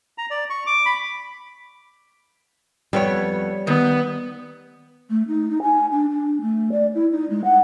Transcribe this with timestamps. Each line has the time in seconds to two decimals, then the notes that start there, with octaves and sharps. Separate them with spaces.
0.18 A#5
0.30 D5
0.50 C#6
0.66 D6
0.86 B5
2.93 F2 G3 B3 C#5
3.67 D#3 B3
5.10 A3
5.28 D#4
5.49 D#4
5.62 G#5
5.91 D4
6.10 D4
6.41 A3
6.71 D5
6.95 E4
7.11 D#4
7.30 G#3
7.44 F#5